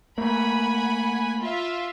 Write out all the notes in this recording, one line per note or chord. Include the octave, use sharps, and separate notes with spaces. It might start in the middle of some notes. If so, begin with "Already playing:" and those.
A3 A#3 F#5 G#5 B5
F4 E5